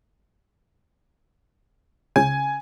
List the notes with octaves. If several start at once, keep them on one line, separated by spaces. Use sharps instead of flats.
C#2 C#3 G#5